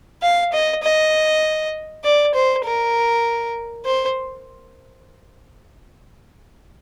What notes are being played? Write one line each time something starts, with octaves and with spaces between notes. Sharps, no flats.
F5
D#5
D#5
D5
C5
A#4
C5